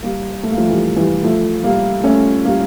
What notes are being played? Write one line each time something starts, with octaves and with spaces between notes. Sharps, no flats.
G3 A#3
A3
A#3
F3 A3
E3 G3
E3 G3
F3 A3
G3 A#3
A3 C#4
G3 A#3